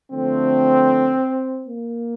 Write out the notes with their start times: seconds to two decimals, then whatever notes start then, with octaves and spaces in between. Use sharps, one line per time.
0.12 D3 F3 A3 C4
1.67 A#3